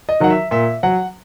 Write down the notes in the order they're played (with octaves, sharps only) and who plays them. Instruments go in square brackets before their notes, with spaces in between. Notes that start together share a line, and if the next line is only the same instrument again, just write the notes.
[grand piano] D#5
D#3 F#3 F#5
E5
A#2 E5
F#3 F#5